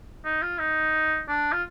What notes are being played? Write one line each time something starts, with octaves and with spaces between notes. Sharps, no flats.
D#4
F4
D#4
D4
F4